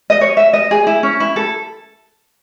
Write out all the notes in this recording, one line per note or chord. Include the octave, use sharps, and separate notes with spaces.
D#5
C#5
E5
D#5
G#4
E4
C#4
E4
A4